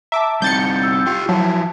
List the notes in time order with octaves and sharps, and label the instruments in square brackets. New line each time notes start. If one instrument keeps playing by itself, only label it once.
[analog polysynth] E5 D6 [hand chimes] A5 A#5
[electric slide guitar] G3 C4 D#4 [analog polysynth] G6 A6 C#7
[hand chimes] E6
[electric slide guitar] F4 G4 [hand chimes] G5
[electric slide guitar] F3 E4 [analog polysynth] F#3 [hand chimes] A5